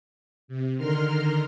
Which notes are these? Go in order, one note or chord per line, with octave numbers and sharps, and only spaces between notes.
C3
D3 D#3 A#4 C6 F6